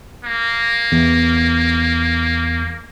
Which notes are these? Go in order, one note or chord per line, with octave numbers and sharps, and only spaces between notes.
A#3
E2